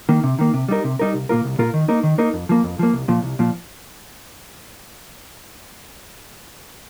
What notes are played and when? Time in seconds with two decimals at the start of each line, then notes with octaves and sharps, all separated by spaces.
0.09 D#3 A#3
0.24 C3
0.39 D#3 A#3
0.54 C3
0.69 G3 D#4 A#4
0.84 C3
0.99 G3 D#4 A#4
1.14 C2
1.29 A#2 A#3 F4 A#4
1.44 C2
1.59 A#2 A#3 F4 A#4
1.74 D#3
1.88 A#3 D#4 A#4
2.03 D#3
2.18 A#3 D#4 A#4
2.34 F2
2.49 F3 A#3
2.64 F2
2.79 F3 A#3
2.93 C2
3.08 A#2 F3
3.23 C2
3.39 A#2 F3